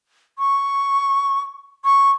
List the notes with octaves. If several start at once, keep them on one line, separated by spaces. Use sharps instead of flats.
C#6
C#6